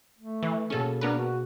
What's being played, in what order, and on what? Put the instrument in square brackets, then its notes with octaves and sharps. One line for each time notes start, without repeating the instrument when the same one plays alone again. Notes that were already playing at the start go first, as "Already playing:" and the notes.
[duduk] A3
[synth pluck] E3
[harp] B2 A#3 G#4 [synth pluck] C#4 A4
[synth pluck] B3 A#4 B4 [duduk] D4 [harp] D7
[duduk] F#4